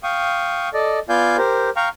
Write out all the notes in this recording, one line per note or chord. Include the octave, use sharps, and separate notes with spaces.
F5 G5 C#6 D#6
A4 D5 D#5
B3 F4 D5 F5 G#5 G6
G4 A#4 C5
F5 G5 A#5 C#6 F6